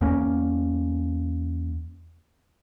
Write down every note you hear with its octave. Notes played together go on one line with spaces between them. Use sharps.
E2 A#3 C#4